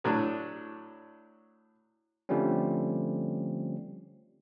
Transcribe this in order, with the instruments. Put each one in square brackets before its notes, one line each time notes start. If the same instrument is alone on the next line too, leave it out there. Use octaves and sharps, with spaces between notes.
[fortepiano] A2 F#3 D4
[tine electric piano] D3 F3 G3 A3 C4 C#4